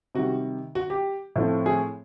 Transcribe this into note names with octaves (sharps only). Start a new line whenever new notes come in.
C3 D#3 G3 F#4
F#4
G4
A2 F3 A3 C4
G#4